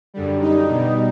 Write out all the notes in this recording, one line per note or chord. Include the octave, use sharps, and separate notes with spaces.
F#2 D3 G3
D#4
B2 G3